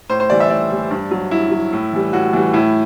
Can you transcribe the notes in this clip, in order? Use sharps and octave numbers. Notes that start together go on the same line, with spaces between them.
A2 C5
C5
E3 G3 D5
E5
A2 D5
E3 G3
G2
F#3
G2 E4
F#3
A2
E3 G3
A2 F#4
E3 G3
A2 E4